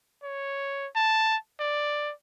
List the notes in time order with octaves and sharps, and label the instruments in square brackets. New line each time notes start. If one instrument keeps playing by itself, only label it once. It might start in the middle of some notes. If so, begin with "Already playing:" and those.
[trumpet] C#5
A5
D5